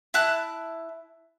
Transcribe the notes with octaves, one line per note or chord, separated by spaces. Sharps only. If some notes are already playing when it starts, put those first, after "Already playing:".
E4 A5 F#6